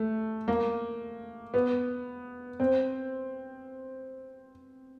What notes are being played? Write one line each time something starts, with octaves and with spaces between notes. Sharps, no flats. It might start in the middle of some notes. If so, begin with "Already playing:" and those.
Already playing: A3
A#3
B3
C4